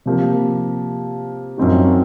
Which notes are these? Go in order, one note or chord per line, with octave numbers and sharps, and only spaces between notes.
C3 F3 A#3
F#2 F3 C4 D#4 F#4